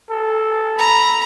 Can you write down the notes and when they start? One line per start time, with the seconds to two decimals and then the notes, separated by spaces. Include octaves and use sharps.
0.10 A4
0.79 A#5 B5